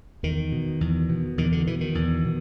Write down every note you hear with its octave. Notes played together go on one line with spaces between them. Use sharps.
E2 D#3
B2
E2
B2
E2 D#3
D3
B2 E3
D#3
E2
B2